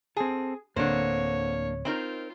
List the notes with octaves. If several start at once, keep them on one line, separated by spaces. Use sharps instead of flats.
C4 G#4 A4
D1 D2 D3 A#3 C4 D4 C5 C#5
C4 D#4 F4 A#4